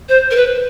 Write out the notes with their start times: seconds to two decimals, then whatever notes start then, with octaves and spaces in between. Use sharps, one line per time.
0.09 C5
0.31 A#4
0.35 B4